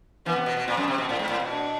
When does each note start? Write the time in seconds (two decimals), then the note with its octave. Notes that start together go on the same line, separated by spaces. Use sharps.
0.25 E3 B3
0.36 C3
0.46 B2
0.57 B2
0.67 A#2 C4
0.77 F#2
0.88 C3
0.98 B2
1.09 A2
1.19 G#2
1.29 A2
1.40 B2
1.50 D4